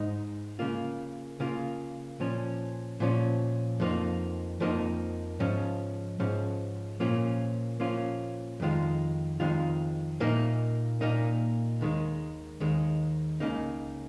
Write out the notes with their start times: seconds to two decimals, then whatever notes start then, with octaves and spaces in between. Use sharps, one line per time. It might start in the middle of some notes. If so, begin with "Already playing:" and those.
Already playing: G#2 G#3 D#4
0.59 C#3 A#3 F4
1.40 C#3 A#3 F4
2.20 A#2 F3 C#4
3.00 A#2 F3 C#4
3.80 F2 F3 A#3 D#4
4.60 F2 F3 A#3 D#4
5.40 G#2 F3 C#4
6.20 G#2 F3 C#4
7.00 A#2 F3 A#3 C#4 F4
7.80 A#2 F3 A#3 C#4 F4
8.60 F2 D#3 G#3 F4
9.40 F2 D#3 G#3 F4
10.20 A#2 A#3 D#4
11.01 A#2 A#3 D#4
11.81 D#2 D#3 G#3
12.60 D#2 D#3 G#3
13.40 C#2 C#3 A#3 D#4